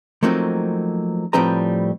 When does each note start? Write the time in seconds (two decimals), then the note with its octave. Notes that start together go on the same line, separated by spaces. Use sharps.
0.23 F3 F#3 A3 A#3 C4 D#4
1.33 A2 F3 G3 C4 B4 A#5